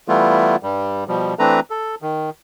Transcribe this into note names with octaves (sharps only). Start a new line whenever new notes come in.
E3 G3 A3 B3 E4 F4
G2 G3
B2 F3 G3
E3 A3 C4 D4 B4 A#5
A4
D#3